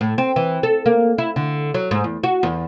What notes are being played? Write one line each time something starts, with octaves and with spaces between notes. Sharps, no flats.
A2
C4
E3
A4
A#3
E4
D3
F#3
G#2
E2
F#4
E2